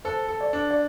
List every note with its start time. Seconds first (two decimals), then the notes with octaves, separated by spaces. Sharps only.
0.05 A4 C5
0.28 A4
0.41 D5
0.53 D4
0.71 D5